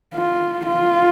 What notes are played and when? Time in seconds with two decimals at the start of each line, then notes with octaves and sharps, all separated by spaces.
0.15 F4
0.66 F4